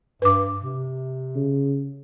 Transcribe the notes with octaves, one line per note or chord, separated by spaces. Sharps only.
G2 B4 D6
C3
C#3